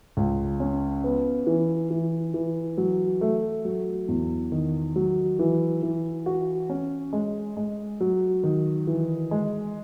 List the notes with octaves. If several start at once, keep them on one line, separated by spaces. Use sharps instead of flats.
C#2
C#4
B3
E3
E3
E3
F#3
A3
F#3
E2
D#3
F#3
E3
E3
F#4
C#4
G#3
G#3
F#3
D#3
E3
G#3